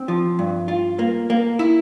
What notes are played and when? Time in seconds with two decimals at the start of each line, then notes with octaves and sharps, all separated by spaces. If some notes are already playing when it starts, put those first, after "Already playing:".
Already playing: C4
0.08 F3
0.39 G2
0.68 F4
0.99 A#3
1.30 A#3
1.59 E4